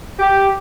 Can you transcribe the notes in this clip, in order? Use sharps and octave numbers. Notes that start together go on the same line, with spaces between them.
G4